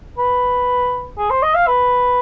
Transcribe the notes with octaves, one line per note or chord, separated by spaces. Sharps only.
B4
G#4
C5
D#5
F5
B4